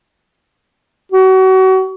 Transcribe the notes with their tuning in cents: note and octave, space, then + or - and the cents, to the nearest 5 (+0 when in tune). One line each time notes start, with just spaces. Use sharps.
F#4 +30